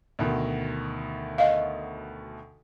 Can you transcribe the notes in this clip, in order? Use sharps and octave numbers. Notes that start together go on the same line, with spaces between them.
D2 B2 D#3
D#5 F5